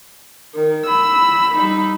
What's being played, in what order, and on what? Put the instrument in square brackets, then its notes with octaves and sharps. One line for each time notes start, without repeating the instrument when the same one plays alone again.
[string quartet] D#3
[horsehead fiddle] B5 [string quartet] E6
[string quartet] G3 D#4